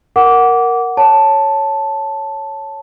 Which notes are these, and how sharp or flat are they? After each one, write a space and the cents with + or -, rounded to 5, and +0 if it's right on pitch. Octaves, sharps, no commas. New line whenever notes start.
A#4 +0 F#5 +0 D6 -20
C#5 +0 A5 +0